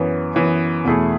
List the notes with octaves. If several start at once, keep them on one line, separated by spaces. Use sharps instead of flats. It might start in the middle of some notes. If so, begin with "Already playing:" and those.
Already playing: F#2 E3 B3
F#2 E3 B3
E2 B2 A3 E4 G#4